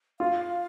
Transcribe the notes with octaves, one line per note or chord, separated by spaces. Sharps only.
F4 F5